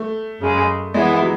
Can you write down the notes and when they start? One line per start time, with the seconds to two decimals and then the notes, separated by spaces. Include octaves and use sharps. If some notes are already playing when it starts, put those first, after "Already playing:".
Already playing: A3
0.39 F#2 C#3 G#3
0.94 E3 G#3 B3 E4
1.21 F#3